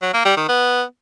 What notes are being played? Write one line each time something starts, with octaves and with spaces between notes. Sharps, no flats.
F#3
A#3
G3
D#3
B3